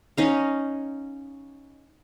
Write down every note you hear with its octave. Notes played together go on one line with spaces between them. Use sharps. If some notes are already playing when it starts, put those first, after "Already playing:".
C#4 D#4 F5